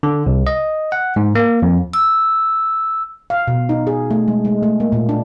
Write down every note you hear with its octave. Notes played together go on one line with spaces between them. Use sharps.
D3
C2
D#5
F#5
G#2
A#3
F2
E6
F5
B2
D#4
G#4
A3
G#3
G#3
A3
A#3
A#2
D4